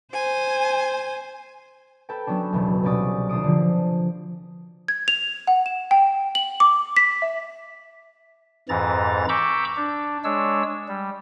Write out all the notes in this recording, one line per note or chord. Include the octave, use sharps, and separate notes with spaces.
C5 G#5
A4 B4 G5
F#3 B3 C#4 D4
E1 C#2
C2 B2 C#4 D5 D#6
D#1 D4 C6 D#6 D7
D3 F3
G#6
F7
F#5
E7
G5
F#7
D6
B6
E5
F2 G#2 E3 A#5 A6
A#5 B5 C#6 D6 E6 G6
D4
G#3 D4 C#5 E6
G3